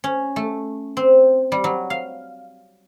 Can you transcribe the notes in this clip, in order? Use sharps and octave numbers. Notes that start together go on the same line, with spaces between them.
C#4
A3
C4
G3
F#3
F5